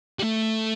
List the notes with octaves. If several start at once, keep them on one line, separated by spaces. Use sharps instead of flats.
G3
A3